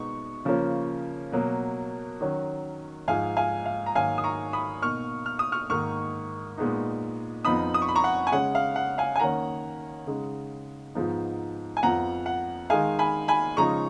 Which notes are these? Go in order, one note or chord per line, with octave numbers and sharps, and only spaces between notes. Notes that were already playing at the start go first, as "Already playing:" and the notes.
Already playing: B2 G#3 B3 D#4 C#6
C#3 F3 A#3 C#4
B2 F#3 A#3
D#3 F#3 C#4
G#2 F3 G#3 D#4 F5 G#5
F5 G#5
F5
A#5
G#2 D#3 F#3 A#3 F5 G#5
D#6
A#5 C#6
B5 D#6
B2 A#3 D#4 C#6 F6
F6
D#6
C#6 F6
G#2 D#3 A#3 D#4 C#6 F6
A#2 G#3 B3 D#4
F2 F3 B3 D#4 B5 D#6
D#6
C#6
B5
A#5 C#6
F#5
G#5
C#3 G#3 C#4 F#5
F5
F#5
F5 G#5
G#5
D#3 A#3 C#4 F#5 A#5
C#3 G#3 D#4
G#2 F3 G#3 B3 D#4
G#5
F2 F3 B3 F#5 A#5
F#5
D#3 G#3 D#4 F5 G#5
G#5 B5
G#5 B5
C#3 F3 G#3 D#4 A#5 C#6